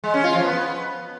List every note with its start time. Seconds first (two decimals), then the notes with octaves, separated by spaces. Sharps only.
0.04 G#3
0.14 C#4
0.24 F4
0.34 F3
0.44 B3